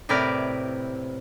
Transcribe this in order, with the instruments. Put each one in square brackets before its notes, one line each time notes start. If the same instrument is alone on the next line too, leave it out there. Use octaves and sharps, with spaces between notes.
[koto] A2 C3 E4 A#4 B4 D5